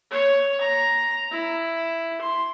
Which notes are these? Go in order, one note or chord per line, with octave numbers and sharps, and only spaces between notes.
C#5
A#5
E4
C6